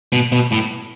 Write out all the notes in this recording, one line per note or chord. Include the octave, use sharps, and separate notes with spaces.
B2
B2
A2